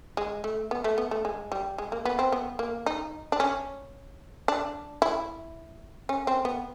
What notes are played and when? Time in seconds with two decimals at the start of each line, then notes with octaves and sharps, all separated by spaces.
0.17 G#3
0.44 A3
0.71 B3
0.84 A3
0.98 B3
1.11 A3
1.25 G#3
1.52 G3
1.78 G#3
1.92 A#3
2.05 B3
2.19 C4
2.32 B3
2.59 A#3
2.86 D#4
3.32 D4
3.40 C#4
4.48 D4
5.02 E4
6.09 C#4
6.27 C4
6.45 B3